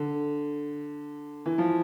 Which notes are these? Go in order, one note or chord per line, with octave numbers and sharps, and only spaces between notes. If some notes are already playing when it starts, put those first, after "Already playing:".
Already playing: D3
E3
F3